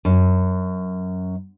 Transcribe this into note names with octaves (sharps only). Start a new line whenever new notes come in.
F#2